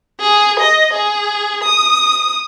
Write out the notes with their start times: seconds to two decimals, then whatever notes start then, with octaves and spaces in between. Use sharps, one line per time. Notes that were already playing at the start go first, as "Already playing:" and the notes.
0.20 G#4
0.60 D#5
0.93 G#4
1.64 D#6